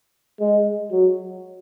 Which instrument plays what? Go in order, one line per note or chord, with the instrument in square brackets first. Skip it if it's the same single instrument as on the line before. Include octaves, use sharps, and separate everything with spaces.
[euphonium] G#3
F#3